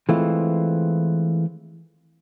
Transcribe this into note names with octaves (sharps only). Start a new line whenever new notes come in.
E3 G#3 A3 C4 F4